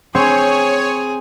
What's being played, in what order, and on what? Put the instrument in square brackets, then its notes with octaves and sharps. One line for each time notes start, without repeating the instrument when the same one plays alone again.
[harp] C4 [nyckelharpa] G#4 G#5 [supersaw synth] C#5